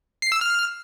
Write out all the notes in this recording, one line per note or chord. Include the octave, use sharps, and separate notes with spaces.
C7
E6
F6